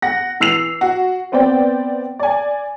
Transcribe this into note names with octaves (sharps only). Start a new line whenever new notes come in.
F#5 A#6
E3 E6 C7 F7
F#4
B3 C4 C5 D5 G5
D5 G#5